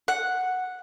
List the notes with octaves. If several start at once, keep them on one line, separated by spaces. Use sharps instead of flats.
F#5